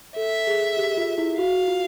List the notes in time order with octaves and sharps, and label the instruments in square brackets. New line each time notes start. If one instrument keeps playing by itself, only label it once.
[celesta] A4 [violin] E5
[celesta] G#4
G4
F4
E4
[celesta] F#4 [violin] F5
[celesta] F4